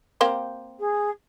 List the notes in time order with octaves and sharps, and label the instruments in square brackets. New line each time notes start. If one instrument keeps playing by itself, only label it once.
[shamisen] A#3 C4 G4
[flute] G#4